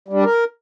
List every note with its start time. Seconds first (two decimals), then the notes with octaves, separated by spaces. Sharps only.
0.08 G3 D4
0.24 A#4